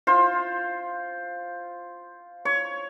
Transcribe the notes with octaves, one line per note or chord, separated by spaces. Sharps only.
F4 C5
C#5